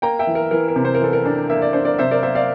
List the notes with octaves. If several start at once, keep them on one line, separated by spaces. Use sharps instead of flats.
A#3 G5 A#5
E5 G5
E3
A#4
E3 A#4
A#4
C3
C5
A#4
E3 A4
A#4
D4
A#3 E5
D5
D4 C5
A#4 D5
C3 C5 E5
A#4 D5
A#3 C5 E5
D5 F5